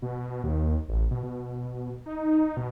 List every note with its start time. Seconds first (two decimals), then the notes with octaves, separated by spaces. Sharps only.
0.02 B2
0.44 D#2
0.88 A1
1.11 B2
1.23 B2
2.06 D#4
2.57 B2